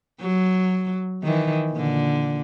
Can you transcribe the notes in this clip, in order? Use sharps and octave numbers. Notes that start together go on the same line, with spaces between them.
F#3
D#3 E3
A#2 D3